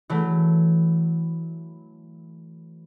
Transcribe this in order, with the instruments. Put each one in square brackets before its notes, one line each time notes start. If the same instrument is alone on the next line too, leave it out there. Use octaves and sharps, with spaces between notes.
[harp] E3 F#3 A3